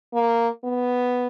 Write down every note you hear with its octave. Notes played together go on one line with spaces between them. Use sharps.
A#3
B3